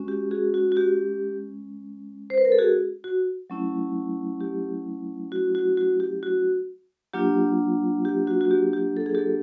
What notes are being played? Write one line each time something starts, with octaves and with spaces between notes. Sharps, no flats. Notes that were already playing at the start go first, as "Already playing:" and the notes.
Already playing: G#3 C#4 F#4
G4
F#4 G#4
F#4
F#4
G4
C5
B4
A#4
A4
F#4 G#4
F#4
F#3 A3 C#4 E4
G4
F#4
F#4
F#4
G4
F#4
F#3 A#3 D4 F4 G4
G4
F#4
F#4
G4
G4
A4
G#4
G4 A4